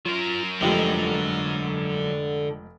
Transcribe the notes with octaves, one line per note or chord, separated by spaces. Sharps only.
F#3 F4 A#4
F1 D3 F3 G#3 G4